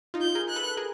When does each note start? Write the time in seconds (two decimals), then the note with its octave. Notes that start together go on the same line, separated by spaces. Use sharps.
0.14 D#4 F4
0.21 G6
0.35 G#4 A#4
0.49 F#6
0.56 A4 B4
0.77 G#4 A#4